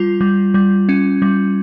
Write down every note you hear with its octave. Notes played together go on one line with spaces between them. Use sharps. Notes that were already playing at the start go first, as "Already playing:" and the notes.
Already playing: G3 F4
G3
G3
C#4
G3